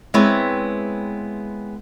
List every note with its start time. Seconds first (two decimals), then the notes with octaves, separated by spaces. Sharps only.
0.14 G#3 B3 C4 E4 B4 C#5